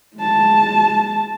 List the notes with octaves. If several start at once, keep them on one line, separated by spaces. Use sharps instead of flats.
G#3 A5